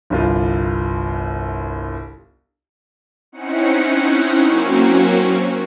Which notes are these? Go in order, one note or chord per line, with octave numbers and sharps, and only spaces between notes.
G1 C2 F4
C4 C#4 D#4 E4 F#5 C#7
F#3 A#3 C4 C#4 F#4